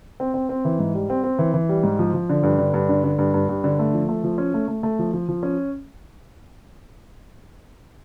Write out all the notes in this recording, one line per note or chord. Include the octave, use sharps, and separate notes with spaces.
C4
C4
C4
E3
G#2
G3
C4
C4
E3
E3
G3
G#2
F3
F3
D3
G2
D3
G2
D3
D3
G2
G2
G2
D3
A3
F3
A3
F3
C#4
A3
A3
A3
F3
F3
F3
C#4